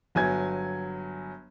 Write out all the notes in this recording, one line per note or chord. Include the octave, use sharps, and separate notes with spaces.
G1 F#3 G#5 G#6